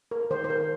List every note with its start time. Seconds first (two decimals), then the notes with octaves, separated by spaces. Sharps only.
0.11 A#4
0.31 D#3 C5
0.44 C5
0.50 A#4